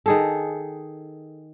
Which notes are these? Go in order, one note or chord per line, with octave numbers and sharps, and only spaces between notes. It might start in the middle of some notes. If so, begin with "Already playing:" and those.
D#3 G#4 A4